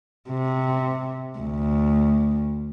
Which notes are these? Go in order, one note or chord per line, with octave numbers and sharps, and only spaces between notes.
C3
D2